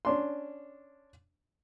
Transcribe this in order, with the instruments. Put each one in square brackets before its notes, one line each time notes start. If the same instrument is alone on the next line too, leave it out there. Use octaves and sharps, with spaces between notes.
[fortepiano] C#4 D4 C6